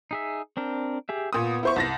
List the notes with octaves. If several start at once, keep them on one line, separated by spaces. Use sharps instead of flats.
D#4 G#4 E5
C4 D4 A#4
G4 G#4 E5
A#2 B3 D#6
E4 C5 C#6
C2 A6 A#6